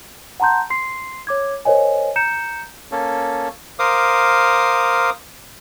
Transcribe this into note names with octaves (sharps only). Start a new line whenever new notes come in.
F#5 A5 A#5 C6 G6
C6 C7
C#5 D6 G#6
A#4 C5 C#5 D#5 G#5
A#5 G6 C#7 E7
A#3 C#4 A4
A#4 C5 F5 D6 D#6